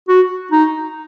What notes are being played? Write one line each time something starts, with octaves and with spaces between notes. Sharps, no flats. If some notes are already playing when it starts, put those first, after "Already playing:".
F#4
D#4